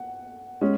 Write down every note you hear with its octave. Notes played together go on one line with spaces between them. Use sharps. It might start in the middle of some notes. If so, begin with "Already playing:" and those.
Already playing: F#5
G#3 C#4